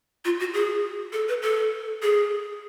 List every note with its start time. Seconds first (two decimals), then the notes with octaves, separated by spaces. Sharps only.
0.25 F4
0.40 F#4
0.54 G#4
1.13 A4
1.29 B4
1.42 A4
2.02 G#4